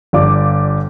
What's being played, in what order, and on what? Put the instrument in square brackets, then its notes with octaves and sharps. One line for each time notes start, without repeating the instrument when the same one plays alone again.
[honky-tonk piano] G1 F4 D5 D6